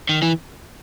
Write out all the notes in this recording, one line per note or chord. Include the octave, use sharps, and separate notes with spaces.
D#3
E3